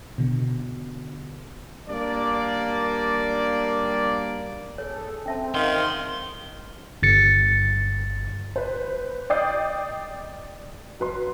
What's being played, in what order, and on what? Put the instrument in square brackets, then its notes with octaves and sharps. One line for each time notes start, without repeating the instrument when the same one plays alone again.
[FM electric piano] B2 D3
[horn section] G3 A#3 D4 D5
[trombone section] G#4 A4 [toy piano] C#5
[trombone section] C4 [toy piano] C#4 E5 A5
[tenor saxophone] D#3 [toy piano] F5 F#5 [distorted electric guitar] C6
[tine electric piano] G1 A6 C#7
[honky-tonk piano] B4 C5
D5 D#5 G5 D#6 G6 C7
F#3 B4 C6